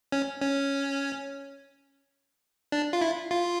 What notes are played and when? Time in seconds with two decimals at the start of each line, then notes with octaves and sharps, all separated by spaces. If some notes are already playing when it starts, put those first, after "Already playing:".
0.12 C#4
0.41 C#4
2.72 D4
2.93 F4
3.01 E4
3.31 F4